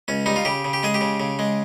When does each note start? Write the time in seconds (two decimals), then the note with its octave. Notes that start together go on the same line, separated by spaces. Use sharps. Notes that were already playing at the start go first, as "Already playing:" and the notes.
0.08 C#2 C#4
0.26 G3 D#4
0.36 F4
0.45 C#3 G4
0.64 C#3
0.73 G4
0.83 G#3 G#4
0.94 G4
1.01 C#3
1.20 C#3
1.39 G#3